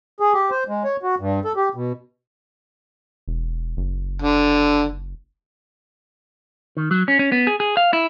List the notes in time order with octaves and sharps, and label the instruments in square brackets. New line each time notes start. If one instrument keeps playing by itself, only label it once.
[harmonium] G#4
G4
C5
G#3
C#5
F#4
G2
A4
G4
B2
[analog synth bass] E1
F#1
[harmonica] D3
[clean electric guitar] D#3
F#3
C#4
C#4
B3
G#4
G#4
F5
E4